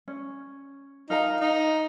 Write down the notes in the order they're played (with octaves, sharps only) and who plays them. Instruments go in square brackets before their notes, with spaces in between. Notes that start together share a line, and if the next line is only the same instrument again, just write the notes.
[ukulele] C#4
[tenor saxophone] D#4 [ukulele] A#4 F5 A#5
[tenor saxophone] D#4